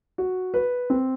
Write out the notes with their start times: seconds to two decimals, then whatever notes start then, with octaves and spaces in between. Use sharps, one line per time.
0.18 F#4
0.54 B4
0.90 C4